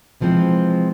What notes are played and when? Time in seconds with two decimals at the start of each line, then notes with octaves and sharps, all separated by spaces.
0.20 C3 E3 F3 G#3 C4